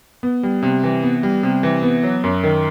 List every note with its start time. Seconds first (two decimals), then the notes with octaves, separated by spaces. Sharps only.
0.23 B3
0.43 G3
0.63 C3
0.83 E3
1.03 B3
1.23 G3
1.43 C3
1.63 E3
1.83 B3
2.03 F#3
2.24 F#2
2.43 D#3